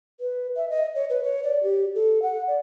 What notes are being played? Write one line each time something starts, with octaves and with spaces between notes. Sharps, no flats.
B4
E5
D#5
C#5
B4
C#5
D5
G4
A4
F#5
D5